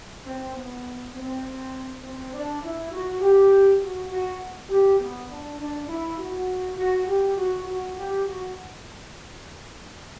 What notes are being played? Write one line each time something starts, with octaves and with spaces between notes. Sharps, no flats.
C4
B3
C4
C4
D4
E4
F#4
G4
F#4
F#4
G4
B3
D4
D4
E4
F#4
F#4
G4
F#4
F#4
G4
F#4